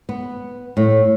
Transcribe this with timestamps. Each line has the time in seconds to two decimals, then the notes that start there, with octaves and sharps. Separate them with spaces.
0.09 B3
0.77 A2